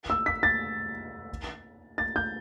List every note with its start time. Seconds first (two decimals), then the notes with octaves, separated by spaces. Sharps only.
0.10 E6
0.26 B6
0.43 A6
1.98 A6
2.16 G6